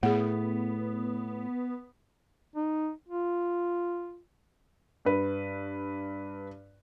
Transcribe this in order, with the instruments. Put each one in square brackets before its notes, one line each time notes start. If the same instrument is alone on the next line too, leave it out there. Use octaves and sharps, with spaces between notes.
[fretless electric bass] A2 [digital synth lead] B3 [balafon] G#4 F#5
[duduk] D#4
F4
[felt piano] G2 B4